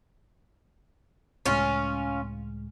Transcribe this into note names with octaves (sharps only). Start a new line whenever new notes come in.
C#2 A2 G#3 C#4 F4